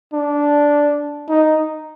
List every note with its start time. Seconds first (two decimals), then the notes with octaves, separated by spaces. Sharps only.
0.14 D4
1.29 D#4